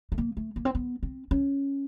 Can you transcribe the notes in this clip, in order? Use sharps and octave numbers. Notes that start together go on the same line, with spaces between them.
A3
A#3
A3
A#3
C4
B3
C4
C#4